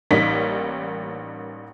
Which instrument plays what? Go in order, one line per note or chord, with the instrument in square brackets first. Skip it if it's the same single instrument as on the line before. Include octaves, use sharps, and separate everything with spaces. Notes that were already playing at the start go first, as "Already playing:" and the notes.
[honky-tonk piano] A1 G3 A#3 D#4 B6